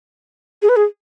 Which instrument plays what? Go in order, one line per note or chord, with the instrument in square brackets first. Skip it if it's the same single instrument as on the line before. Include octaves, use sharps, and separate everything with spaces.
[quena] G#4
B4
G#4